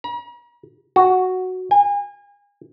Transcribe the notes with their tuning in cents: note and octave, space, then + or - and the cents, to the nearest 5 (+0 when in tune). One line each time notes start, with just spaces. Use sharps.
A#5 +45
F#4 +0
G#5 -35